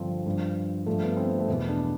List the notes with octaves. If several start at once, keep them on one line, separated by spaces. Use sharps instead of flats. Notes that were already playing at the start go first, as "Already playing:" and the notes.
Already playing: G2 D3 F3 C4
G2 F3
G2 F3 A3
B3
C4
A3
E2 B2 B3
D4